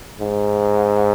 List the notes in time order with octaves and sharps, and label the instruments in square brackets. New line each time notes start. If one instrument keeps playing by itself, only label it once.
[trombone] G#2